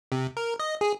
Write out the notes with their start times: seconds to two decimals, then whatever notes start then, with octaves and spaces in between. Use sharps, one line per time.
0.12 C3
0.37 A#4
0.59 D#5
0.81 G#4